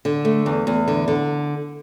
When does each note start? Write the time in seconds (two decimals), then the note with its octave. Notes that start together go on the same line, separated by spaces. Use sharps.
0.05 D3
0.25 A3
0.46 E2
0.67 E2
0.88 D3
1.08 D3